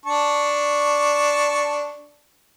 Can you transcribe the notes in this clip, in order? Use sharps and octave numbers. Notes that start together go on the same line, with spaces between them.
D4 A5 C#6